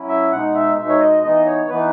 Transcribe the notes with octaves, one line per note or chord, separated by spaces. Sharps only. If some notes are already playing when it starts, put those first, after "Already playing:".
Already playing: F#3 C#4 E4
E5
B2 G#3 D#4 F#5
E5
B2 G#3 D#4 E5
C#5
D#5
E3 B3 D#4 D#5
C#5
E3 B3 D#4 B4